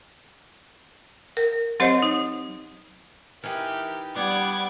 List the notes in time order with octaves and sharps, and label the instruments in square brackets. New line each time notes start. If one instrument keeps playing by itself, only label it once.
[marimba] A#4
F#3 C4 G4 C5 C#5 D#5
D#4
[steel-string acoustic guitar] E3 D#4 [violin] G4 [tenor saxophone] A#4
[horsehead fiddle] G3 F#5 [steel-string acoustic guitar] B3 [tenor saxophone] D4 [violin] D6 G#6